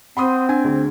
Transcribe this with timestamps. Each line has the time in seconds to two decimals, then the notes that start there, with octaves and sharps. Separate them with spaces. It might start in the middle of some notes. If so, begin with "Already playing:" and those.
0.17 C4 F#5 B5 C6 D#6
0.49 D4 G#5 G#6
0.64 D2 G#4